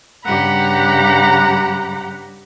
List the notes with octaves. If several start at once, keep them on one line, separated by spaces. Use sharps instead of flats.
G2 C#3 G4 F#5 A#5 B5